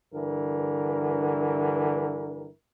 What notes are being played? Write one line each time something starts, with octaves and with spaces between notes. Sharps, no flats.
G2 D3 E3 A#4